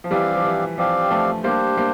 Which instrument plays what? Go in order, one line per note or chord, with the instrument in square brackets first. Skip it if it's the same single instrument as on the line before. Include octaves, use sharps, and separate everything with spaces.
[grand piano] F3
[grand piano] E3 G3 [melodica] C4 G4 D5 F5
[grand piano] F3
E3
[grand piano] F3 [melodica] C4 G4 D5 F5
[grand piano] F3 A3
[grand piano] G3 A#3 [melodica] D4 G4 C5
[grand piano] G3 A#3